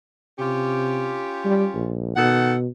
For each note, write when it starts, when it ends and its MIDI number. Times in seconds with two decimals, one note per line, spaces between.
0.39 1.23 48
0.39 1.94 61
0.39 1.94 65
0.39 1.94 67
1.45 1.65 55
1.74 2.13 34
2.16 2.67 47
2.16 2.53 51
2.16 2.53 69
2.16 2.53 78